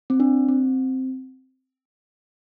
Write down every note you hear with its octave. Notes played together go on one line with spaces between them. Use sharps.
C4
D4
C4